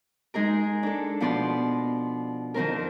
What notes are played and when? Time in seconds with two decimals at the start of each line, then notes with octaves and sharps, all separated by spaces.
0.34 G#3 D#4 G#4 A#4
0.83 D4 A4
1.20 B2 F3 B3 D5 C6
2.54 F2 D#3 C4 A#4